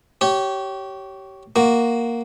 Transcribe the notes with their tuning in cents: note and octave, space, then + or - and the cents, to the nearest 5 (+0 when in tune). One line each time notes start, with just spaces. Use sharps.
G4 -25 C#5 +0
A#3 +0 F#4 +0